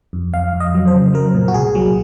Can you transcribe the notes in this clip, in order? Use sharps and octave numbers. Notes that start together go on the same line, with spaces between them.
F2
F2 F5
F2
D#5
F#3
C5
C#3
F#3 A#4
A#2
F#4
C2 G#4
F#3